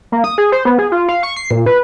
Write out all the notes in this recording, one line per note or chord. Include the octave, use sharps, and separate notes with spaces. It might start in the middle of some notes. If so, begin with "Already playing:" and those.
A#3
D#6
G#4
C5
B3
G#4
F4
F5
C#6
C7
A#2
B4